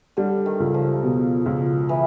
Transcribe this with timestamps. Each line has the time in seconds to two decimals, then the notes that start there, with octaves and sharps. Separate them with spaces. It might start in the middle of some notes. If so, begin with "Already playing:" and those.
0.17 D3 G3
0.46 D#3
0.60 C#2
0.74 F3
1.03 B2
1.46 C#2
1.89 E3